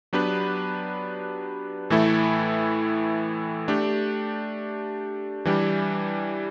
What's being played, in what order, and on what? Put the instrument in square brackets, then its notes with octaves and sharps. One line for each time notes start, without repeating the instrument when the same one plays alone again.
[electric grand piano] F#3 B3 D4 G4 B4
A2 E3 A3 E4 A4
A3 D4 G4
E3 G3 D4 G4